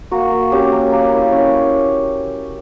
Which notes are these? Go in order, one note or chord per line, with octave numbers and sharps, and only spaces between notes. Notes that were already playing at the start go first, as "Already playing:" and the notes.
A#3 F#4
A#3
C#4 G4
A#3
A#3
E4
C#4